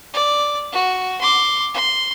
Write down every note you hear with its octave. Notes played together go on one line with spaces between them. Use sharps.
D5
F#4
C6 D6
C6